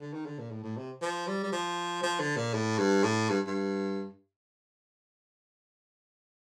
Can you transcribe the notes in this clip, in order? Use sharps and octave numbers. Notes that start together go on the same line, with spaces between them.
D3
D#3
D3
A#2
A2
A2
C3
F3
G3
G3
F3
F3
D3
A#2
A2
G2
A2
G2
G2